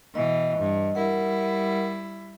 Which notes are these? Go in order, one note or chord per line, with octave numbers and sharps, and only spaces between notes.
B2 E3 D#5
G2
G3 E4 A#4 F#5